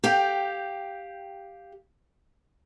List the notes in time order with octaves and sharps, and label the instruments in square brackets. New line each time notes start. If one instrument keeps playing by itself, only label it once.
[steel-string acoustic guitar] G4 F5 G5